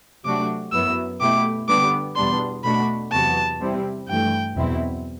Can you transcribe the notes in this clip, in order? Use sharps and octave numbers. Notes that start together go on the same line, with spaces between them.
C3 F#3 A3 D4 F#4 D6
F#2 F#3 B3 E4 E6
B2 A3 E4 G4 D6
D3 G3 B3 D4 G4 D6
E2 B2 G3 B3 D4 C6
B2 A3 D4 F#4 B5
E2 C3 F#3 B3 F#4 A5
C3 G3 C4 E4
G2 E3 A3 G5
E2 B2 F#3 C4 E4